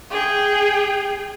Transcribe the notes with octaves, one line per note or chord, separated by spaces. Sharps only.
G#4 G5